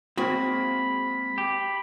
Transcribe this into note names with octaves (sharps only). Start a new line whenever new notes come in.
G#3 A#3 C4 F#4 B5
G4